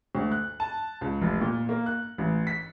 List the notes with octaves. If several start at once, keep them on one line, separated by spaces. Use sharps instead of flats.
D2
F#6
A5
C#2
F1
A#2
A#3
F#6
A1
B6